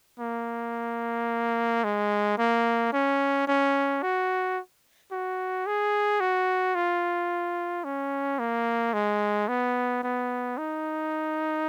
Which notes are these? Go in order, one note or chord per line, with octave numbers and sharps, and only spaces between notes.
A#3
G#3
A#3
C#4
C#4
F#4
F#4
G#4
F#4
F4
C#4
A#3
G#3
B3
B3
D#4